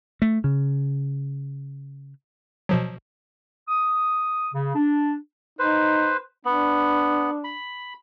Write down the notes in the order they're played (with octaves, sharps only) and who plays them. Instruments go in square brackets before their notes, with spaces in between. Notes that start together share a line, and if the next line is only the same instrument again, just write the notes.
[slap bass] A3
C#3
[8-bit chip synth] B2 F3 F#3
[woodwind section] D#6
C#3
D4
[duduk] D#4 [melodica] B4 C5
[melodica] B3 [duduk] D4
[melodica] B5